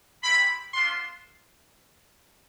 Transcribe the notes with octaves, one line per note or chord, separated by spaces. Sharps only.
G#3 C4 E4 G4 B5
B3 D4 F4 C6